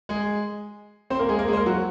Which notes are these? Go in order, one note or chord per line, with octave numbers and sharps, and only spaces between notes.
G#3 G#4
C4 C5
A#3 A#4
G#3 G#4
A#3 A#4
G#3 G#4
C5
A#3 A#4
F#3 F#4